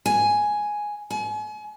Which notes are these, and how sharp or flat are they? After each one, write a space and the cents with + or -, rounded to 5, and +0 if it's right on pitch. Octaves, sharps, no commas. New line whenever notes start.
G#5 +5
G#5 +40